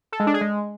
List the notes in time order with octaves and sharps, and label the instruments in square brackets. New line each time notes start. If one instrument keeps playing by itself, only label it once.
[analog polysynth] A4
G#3
D4
G#4
G#3